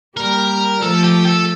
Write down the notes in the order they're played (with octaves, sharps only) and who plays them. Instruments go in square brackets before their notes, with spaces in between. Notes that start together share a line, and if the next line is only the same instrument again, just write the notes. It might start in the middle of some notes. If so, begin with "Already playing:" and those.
[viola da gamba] G3 A#3 [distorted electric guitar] A#4
[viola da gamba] F3 A3 [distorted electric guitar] A4
[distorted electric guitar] G4
A4